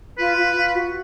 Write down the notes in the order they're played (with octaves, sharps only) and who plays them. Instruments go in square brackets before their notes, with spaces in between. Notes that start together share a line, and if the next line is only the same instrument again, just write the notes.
[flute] F4 [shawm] B4
[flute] F4
F4
F#4